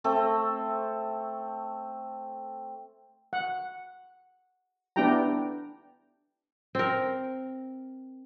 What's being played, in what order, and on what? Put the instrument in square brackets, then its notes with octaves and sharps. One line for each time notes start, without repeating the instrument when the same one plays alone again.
[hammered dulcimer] A3 C4 A4
[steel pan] F#5
B3 D4 E4 G4 G5 A#5
[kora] C4 A#4